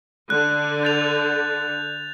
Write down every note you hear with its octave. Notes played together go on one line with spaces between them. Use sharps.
D3 F#6
G6 A6 F7